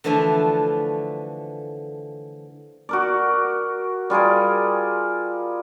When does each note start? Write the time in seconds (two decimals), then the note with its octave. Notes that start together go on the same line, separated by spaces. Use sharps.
0.04 D3 E3 F3 A3 E5 G#5
2.89 F#4 A#4 D5
4.10 G3 F4 G#4 A#4